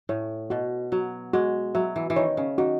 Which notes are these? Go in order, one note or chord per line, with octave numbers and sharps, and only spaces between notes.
A2 C#5
B2 F#4
F#3 F#4
G#3 F#4
F#3 E5
E3
E3
D#3 C#5
C#3
D#3 F#4